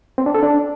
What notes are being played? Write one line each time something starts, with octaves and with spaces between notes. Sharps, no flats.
C4
D4
A4
D4